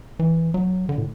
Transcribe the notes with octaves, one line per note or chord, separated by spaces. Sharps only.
E3
F#3
D3
A2